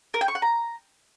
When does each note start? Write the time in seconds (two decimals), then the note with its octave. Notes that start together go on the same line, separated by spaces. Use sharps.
0.14 A#4
0.21 G5
0.28 C#6
0.35 F#5
0.42 A#5